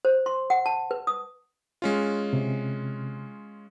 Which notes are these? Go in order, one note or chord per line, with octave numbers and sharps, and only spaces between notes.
C5
C6
F#5
A5
B4
D#6
G#3 C#4 F4
C3